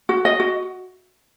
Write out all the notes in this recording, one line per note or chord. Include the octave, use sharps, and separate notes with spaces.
F#4
D#5
F#4